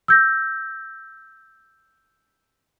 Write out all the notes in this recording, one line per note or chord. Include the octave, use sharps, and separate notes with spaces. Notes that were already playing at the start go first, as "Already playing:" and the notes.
E6 G6 A#6